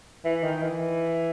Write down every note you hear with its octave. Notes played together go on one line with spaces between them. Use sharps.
E3
D#3
E3